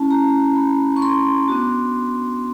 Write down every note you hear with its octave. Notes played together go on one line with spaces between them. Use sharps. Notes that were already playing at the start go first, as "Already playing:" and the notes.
Already playing: A3 C#4 E4 A5
A#5
B5
C#6
C6
B3 D4 F#4